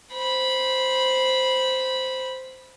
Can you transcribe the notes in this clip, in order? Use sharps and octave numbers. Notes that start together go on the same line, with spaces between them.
C5 B5